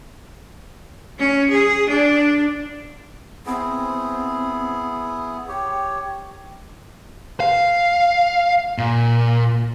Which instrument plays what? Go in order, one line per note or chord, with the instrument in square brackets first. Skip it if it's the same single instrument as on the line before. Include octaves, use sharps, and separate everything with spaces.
[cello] C#4
G#4
D4
[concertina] B3 E4 G#4 [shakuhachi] C4
[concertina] G4 C#5 [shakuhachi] G5
[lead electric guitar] F5
A#2